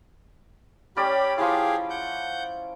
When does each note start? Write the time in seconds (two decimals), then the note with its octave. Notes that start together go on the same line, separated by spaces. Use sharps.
0.97 G3 C#4 G4 D5 B5
1.38 F3 E4 G4 G#4 F5
1.90 F#5 G6